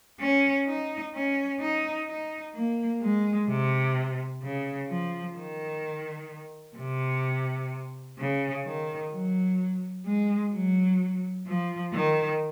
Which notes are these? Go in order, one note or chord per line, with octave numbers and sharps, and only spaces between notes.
C#4
D#4
C#4
D#4
D#4
A#3
G#3
C3
C#3
F3
D#3
C3
C#3
D#3
F#3
G#3
F#3
F3
D#3